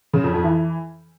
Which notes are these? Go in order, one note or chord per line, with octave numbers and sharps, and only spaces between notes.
C#3
F2
F2
E3